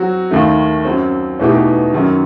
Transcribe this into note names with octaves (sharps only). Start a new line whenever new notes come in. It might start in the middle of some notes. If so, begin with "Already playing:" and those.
Already playing: F#3 C4 F#4
D#2 D#3 A3
F#2 F#3 C4
E2 B2 A3 D#4 G4
F#2 D#3 F#3